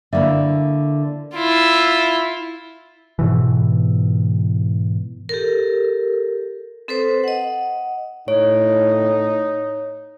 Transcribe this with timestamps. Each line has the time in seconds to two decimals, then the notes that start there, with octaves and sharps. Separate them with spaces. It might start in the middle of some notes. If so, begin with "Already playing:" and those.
0.13 D3 A#3 E4 E5
1.35 E4 F4
3.19 G#2 B2 E3
5.29 G4 A4 A#4
6.88 C4 A4 B4 C5
7.24 D#5 F#5
8.28 A2 D#4 C#5